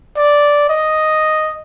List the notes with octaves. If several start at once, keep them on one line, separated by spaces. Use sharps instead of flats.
D5
D#5